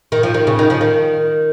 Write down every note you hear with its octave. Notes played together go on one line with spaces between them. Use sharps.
D#3
F3
D#3
C#3
D#3
F3
D#3